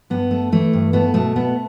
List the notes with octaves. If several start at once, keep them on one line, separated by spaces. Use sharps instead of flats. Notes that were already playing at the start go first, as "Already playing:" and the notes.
G2 B3
A3
E3 A3
G2
A3 B3
B2 A3
A3 B3